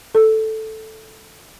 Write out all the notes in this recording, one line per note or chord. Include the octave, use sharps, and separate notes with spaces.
A4